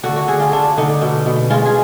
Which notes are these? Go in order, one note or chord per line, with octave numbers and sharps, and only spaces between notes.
D3 F#4
F#4
D3 G#4
F4
D3 D4
D3 D#4
B2
B2
G#3 F4
G#4